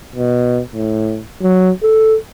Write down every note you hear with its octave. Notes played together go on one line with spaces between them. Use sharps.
B2
A2
F#3
A4